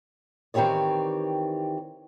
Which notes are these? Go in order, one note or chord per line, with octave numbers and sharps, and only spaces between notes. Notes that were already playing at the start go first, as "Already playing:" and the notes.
D#3 E3 C4 G4 C#5 D5